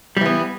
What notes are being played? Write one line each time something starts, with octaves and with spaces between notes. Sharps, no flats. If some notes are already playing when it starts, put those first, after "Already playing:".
E3 G3 B3